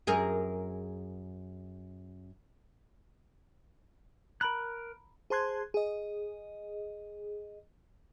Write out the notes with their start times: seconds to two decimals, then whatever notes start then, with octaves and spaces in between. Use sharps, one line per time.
0.07 F#2 G#4 A#4
4.41 A#4 A#5 B5 F#6
5.30 G#4 C5 A5 C6 F#6 G#6
5.74 G#4 D#5